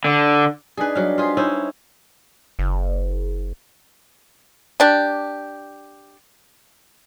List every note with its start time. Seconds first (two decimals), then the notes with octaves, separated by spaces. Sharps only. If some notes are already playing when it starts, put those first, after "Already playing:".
0.05 D3
0.77 D4 D#4 G#4 B4 G#5
0.95 F#3 G3 F5
1.18 F4 G#4 C5 B6
1.37 C#4 D#4 E4
2.59 F#1
4.80 D4 G4